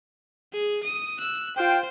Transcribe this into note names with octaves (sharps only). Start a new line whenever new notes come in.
G#4
D#6
E6 F#6
F4 C5 F5 G5